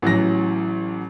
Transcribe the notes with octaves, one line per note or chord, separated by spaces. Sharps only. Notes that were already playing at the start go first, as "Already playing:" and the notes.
A1 E3 F#3 A#6